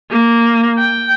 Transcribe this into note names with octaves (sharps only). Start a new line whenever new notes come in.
A#3
G5